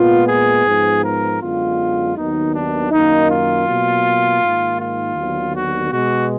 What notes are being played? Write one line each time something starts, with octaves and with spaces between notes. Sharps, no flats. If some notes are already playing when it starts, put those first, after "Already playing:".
Already playing: A#2 G#3 B3 F4
G#4
G#2 F3 B3
A#4
F#2 D3 G#3 B3 F4
D#2 D#3 F#3 B3 D#4
D4
F#2 D#3 A#3 D#4
F4
B2 F#3 A#3
G#2 D#3 A#3
F4
D#2 D3 F#3 B3
F#4
B2 G#3 B3 F#4